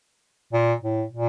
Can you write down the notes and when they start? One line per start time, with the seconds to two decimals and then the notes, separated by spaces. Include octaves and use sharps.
0.53 A#2
0.83 A2
1.13 A#2